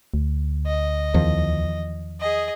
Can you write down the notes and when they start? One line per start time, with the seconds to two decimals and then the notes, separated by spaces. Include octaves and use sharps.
0.14 D2
0.67 D#5
1.14 E2 D#3 F3
2.20 G#4 D#5